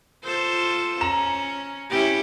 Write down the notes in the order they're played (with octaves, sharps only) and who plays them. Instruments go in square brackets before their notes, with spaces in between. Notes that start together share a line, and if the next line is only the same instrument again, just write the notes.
[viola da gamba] F4 A4 C5
[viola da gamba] C#4 [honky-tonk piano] A#5 E7
[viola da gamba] C#4 E4 G4